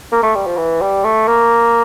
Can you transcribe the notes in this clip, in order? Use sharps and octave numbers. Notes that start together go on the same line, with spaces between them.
A#3
A3
G3
F3
E3
G3
A3
A#3